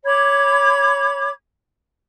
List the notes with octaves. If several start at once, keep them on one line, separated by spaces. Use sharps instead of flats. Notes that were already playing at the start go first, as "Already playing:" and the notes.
C#5 B5 D6 G#6